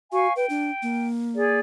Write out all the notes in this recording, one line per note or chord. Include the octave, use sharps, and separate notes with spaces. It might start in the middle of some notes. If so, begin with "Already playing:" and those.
F#4 F5 G#5 C#6
B4 G5
D4
A#3
G#4 D5